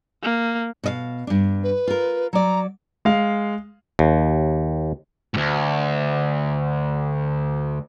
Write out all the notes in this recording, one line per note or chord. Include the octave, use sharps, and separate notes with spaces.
A#3
B2 D#5 F5
G2 D4
B4
F4 A#4
F#3 D5 A#5
G#3 F5
D#2
D2 G#2